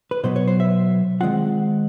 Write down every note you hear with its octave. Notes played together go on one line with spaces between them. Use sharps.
B4
B2 F#3 B3 C5
C#5
C5
E5
D#3 G#3 C4 F4 F#5